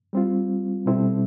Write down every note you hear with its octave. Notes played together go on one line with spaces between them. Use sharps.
G3 C4 F4
B2 G3 C4 E4 A4